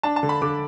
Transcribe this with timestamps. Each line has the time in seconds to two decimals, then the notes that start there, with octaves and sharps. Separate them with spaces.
0.03 D4 A5
0.16 A5
0.23 D3
0.29 B5
0.42 D3 D6